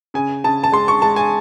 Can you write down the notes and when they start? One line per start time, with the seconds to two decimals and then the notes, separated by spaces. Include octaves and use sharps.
0.14 C#3 G#5
0.44 C#3 A5
0.64 A5
0.72 G#3 C6
0.88 C#6
1.02 G#3 A5
1.16 G#5